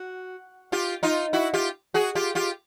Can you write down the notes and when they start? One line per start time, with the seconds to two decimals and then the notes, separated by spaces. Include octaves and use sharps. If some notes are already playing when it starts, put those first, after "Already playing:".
Already playing: F#4
0.72 F4 G4
1.03 D#4 F4
1.33 E4 F#4
1.54 F4 G4
1.94 F#4 G#4
2.15 F4 G4
2.35 F4 G4